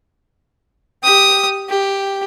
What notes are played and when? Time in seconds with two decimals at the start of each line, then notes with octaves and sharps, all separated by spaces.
1.03 G4 D#6
1.69 G4